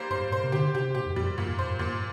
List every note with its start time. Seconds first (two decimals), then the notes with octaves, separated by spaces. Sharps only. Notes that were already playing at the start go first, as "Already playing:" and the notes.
Already playing: G3 A#3 C5
0.10 G2 C5
0.21 G2
0.31 A#2 C5
0.43 C3
0.52 D3 G4
0.75 C3 G4
0.95 A#2 G4
1.06 F2
1.16 F2 G3
1.26 G2
1.38 G2 A#2
1.49 F2
1.59 G2 C5
1.69 F2
1.79 G2 A#2